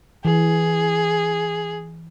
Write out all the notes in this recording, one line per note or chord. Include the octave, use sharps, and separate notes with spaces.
E3 G#4